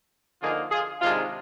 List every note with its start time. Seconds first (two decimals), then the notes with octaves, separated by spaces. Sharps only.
0.41 D3 F3 A#3 D#4 F4 G#4
0.71 F4 G#4
1.01 C3 D#3 G#3 D4 F4